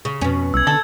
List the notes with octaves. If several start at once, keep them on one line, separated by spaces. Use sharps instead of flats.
C#3
F2 B2 C#4
C2 E6 G#6
D3 A4